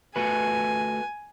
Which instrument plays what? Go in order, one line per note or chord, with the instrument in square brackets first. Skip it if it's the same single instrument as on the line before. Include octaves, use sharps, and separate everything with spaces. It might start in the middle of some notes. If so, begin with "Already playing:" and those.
[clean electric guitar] A3 F#4 B4 [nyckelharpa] G#5